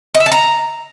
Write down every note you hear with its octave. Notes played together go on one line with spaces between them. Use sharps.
D#5
E5
A5
A#5